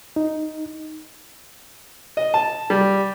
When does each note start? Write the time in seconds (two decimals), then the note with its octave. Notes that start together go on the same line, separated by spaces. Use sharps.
0.16 D#4
2.17 D#5
2.34 A5
2.70 G3